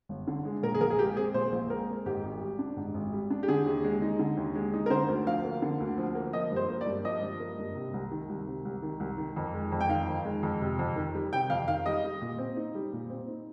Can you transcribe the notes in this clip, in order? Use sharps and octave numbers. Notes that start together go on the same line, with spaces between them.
G1
D3
G#3
A#2 A#4
G#4
A#1 A#4
G#4
G#3 G4
C4 G#4
A#2 C5
A#1
G#3 A#4
C4
G#2 G4
G#1
G3
D4
G#2
G#1
G3
D4
G4
D3 G#4
D#2
G#3
D#4
D3
D#2
G#3
D#4
A#4
D3 C5
D2
F3 F5
A#3
D3
D2
F3
A#3
F3 D#5
G2
C5
A#3
D5
G2
F3 D#5
G2
A#3
G2
C3
C2
D#3
C2
C3
C2
D#3
C2
D#3
F2
G#3
F2
G5
D#3 F5
F2
G#3
F2
C3
F2
D#3
G3
C3 G5
F2 F5
D#3 F5
G3 D#5
G3
A#2
C4
D#4
G3
A#2
C4
D#4